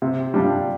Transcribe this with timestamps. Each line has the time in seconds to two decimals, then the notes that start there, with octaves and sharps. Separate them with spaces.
0.02 C3
0.34 G3 D4 F4